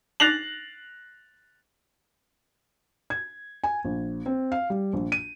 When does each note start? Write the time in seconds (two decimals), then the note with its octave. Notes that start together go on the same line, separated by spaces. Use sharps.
0.20 F#6 A6 A#6 C7 F7 F#7
3.10 G#6
3.64 G#5
3.85 A#1
4.26 C4
4.52 F5
4.70 G3
4.93 A#1
5.12 D#7